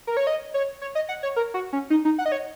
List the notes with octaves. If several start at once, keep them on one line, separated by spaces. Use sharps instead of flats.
A#4
C#5
D#5
C#5
C#5
D#5
F#5
C#5
A#4
F#4
C#4
D#4
D#4
F#5
D#5
C#5